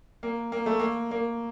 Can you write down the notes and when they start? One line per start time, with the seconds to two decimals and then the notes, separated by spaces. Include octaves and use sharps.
0.23 A#3
0.52 A#3
0.66 A3
0.80 A#3
1.11 A#3